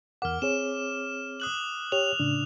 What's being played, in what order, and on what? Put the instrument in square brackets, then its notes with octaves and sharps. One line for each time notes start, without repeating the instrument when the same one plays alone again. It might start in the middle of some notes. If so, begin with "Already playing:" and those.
[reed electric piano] E2 A#4 F#5 [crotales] D6 F6
[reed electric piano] C4 G#4 C#5 [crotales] E7
[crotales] D#6 F#6 F#7
[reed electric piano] G4 C#5 [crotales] F7
[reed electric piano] A2 C#3 D4